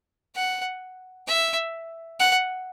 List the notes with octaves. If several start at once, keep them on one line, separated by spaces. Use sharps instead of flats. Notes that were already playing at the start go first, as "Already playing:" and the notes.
F#5
E5
F#5